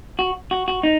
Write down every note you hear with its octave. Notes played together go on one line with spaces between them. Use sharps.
F#4
F#4
F#4
D#4